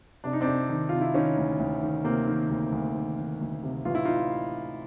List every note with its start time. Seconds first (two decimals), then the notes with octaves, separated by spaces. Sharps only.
0.24 C3 D4
0.33 D#4
0.41 C4 D4
0.47 C3
0.69 D#3
0.89 C3 F4
1.01 E4
1.14 D#3 C#4 D#4
1.38 D2
1.59 D2
1.83 D#3
2.04 C3 A#3 C4
2.27 D#3
2.49 D2
2.72 D2
2.95 D#3
3.17 D#3
3.41 D2
3.63 C3
3.85 A1 F4
3.95 E4
4.05 D#4 F4